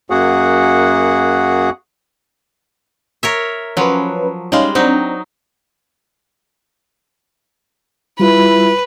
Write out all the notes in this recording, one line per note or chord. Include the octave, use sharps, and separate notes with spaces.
F#2 A#3 F#4 G#4 F#5
A#4 C#5 E5
F3 F#3 C#4 B4
G3 G#3 C#4 D#4 F5
F#3 C4 D4 D#4
G3 E4 F4 B4